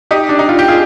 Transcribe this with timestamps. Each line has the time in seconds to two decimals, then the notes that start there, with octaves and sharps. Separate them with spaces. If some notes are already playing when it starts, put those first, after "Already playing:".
0.11 D#4 G4
0.29 D4
0.39 D#4
0.49 F4
0.59 G4
0.68 F4 G#4